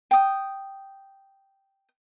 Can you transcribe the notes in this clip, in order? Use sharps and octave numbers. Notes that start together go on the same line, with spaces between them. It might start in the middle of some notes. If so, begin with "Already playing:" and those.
G5 D#6